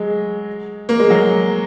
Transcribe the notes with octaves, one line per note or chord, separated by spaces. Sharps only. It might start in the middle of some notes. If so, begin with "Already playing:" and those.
Already playing: F#3 G#3
A#3
G#3
F#3